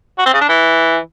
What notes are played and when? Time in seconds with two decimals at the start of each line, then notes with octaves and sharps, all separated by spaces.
0.18 F#4
0.26 C4
0.34 C#3
0.41 D4
0.49 E3